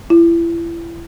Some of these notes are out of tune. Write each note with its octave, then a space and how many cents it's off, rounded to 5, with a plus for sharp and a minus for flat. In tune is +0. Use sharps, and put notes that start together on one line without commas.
E4 +30